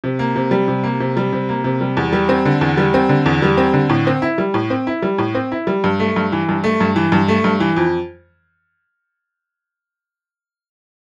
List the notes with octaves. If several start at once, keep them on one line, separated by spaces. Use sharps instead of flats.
C3
A#3
C3
G3
C3
A#3
C3
G3
C3
A#3
C3
G3
E2
G3
C4
D3
E2
G3
C4
D3
E2
G3
C4
D3
A2
C4
E4
G3
A2
C4
E4
G3
A2
C4
E4
G3
G2
A3
G2
E3
G2
A3
G2
E3
G2
A3
G2
E3
F2